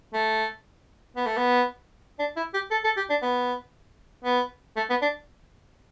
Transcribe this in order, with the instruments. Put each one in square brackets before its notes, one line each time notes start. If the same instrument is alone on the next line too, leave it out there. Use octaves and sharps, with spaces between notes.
[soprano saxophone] A3
B3
A3
B3
D4
E4
G4
A4
A4
G4
D4
B3
B3
A3
B3
D4